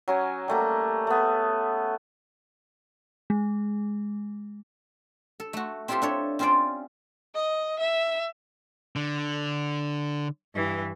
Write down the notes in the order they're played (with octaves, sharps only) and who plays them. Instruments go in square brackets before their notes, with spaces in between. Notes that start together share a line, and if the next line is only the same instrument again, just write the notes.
[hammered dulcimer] F#3 C#4 G#5
G3 A3 A#3
A3 B3
[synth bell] G#3
[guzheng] A4
A3 F#4
C4 E4 F4 G4 A4 C6
D4 A4 C#5
C4 C#4 F4 C5 D5 G5
[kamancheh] D#5
E5
[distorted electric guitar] D3
[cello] G2 E3